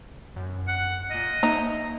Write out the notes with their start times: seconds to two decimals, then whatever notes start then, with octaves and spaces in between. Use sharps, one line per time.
0.36 F#2
0.68 F#5
1.11 A#2 D#5 F6
1.43 A#3 D#4 E5